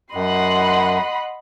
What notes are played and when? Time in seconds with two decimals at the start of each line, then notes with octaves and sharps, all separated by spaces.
0.15 F#2 D#5 F#5 B5 C6